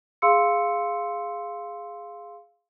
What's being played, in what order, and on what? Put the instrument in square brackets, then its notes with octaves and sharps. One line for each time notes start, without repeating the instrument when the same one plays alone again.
[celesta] G#4 F5 C6 E6 C#7